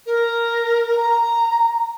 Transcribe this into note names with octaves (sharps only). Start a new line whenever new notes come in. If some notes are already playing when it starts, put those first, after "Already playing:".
A#4
A#5